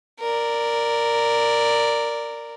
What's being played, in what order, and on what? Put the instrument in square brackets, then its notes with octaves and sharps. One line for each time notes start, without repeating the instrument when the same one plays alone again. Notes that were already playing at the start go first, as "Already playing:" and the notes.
[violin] A#4 D5